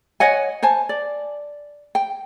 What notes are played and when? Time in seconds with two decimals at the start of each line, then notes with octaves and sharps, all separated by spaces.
0.20 C#5 D#5 F#5 G#5
0.63 C5 G#5 A5
0.89 D5
1.95 G5